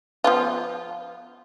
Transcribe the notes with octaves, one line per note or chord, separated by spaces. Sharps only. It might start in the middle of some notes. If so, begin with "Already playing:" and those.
F3 B3 F4